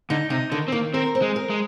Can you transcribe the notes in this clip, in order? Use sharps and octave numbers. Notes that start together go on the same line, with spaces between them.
D3 D#4
C3 D#4
D3 D#3
C4
D#3 A#3
C4 A#4
C4
G#3
A#4
G#3